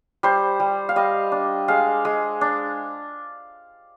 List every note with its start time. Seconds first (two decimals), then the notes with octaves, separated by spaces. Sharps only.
0.23 G3 C5
0.60 G3
0.89 F5
0.96 G3 D#5
1.32 D4
1.68 G#3 F5
2.05 G#3
2.41 D4